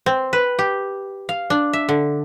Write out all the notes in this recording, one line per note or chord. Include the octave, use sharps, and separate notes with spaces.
C4
B4
G4
F5
D4
E5
D3